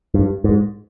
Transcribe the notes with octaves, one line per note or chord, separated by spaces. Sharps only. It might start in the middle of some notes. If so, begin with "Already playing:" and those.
G2
G#2